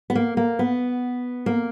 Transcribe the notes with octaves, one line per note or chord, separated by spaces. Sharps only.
B3
A#3
A#3
B3
A#3